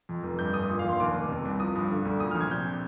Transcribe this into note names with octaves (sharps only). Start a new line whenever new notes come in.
F2
F1
G2 G6
G1 D#6
A#2
F5
A#1
C6
D#2 D6
F1
C3
C2
F3 D#6
G2
D3
D2
A#2 D#6
F6
A#1
G#6
C3 G6